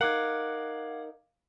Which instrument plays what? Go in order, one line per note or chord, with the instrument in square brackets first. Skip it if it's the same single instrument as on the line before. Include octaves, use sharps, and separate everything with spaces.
[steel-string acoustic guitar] D#4 A#4 [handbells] F5 D6 G#6 [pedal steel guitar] F#5